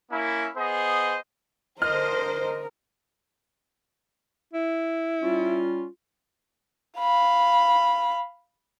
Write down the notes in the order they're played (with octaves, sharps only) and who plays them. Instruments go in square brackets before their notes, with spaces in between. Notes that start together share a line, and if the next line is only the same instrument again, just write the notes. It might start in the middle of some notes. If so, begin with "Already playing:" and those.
[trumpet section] A#3 C#4 E4
B3 G#4 C5 D#5
[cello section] D3 D#5 [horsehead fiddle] A#4 [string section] C5 [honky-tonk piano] F6
[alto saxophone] E4
[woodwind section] G3 C#4 F4
[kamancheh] F5 B5